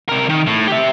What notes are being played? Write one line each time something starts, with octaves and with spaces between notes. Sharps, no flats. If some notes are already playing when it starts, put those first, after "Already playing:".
C3 A#4
D#3
A2
G4 E5